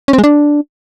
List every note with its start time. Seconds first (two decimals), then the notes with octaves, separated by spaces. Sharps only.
0.08 C#4
0.13 C4
0.18 G#3
0.24 D4